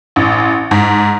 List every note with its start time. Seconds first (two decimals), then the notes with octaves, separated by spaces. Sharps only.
0.16 A1
0.71 G#2